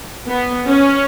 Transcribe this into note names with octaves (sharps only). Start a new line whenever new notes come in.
B3
C#4